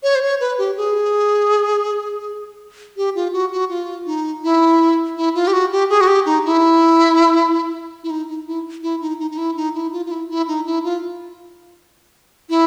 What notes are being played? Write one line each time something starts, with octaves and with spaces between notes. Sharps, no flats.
C#5
C5
C#5
B4
G4
G#4
G4
F4
F#4
F#4
F4
D#4
E4
E4
F4
G4
F#4
G4
G#4
F#4
G4
D#4
E4
E4
D#4
D#4
E4
E4
D#4
D#4
D#4
E4
D#4
E4
F4
F4
E4
E4
D#4
E4
F4
E4